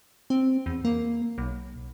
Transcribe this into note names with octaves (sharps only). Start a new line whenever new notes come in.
C4
E2
A#3
B1